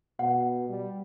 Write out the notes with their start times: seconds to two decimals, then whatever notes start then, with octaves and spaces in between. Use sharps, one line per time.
0.19 B2 F#5
0.69 G3